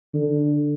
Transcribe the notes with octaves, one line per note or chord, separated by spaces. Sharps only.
D3